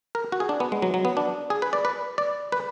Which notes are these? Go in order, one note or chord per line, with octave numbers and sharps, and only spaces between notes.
A#4
F#4
G#4
D4
B3
G#3
F#3
F#3
B3
D4
G#4
B4
D5
B4
D5
B4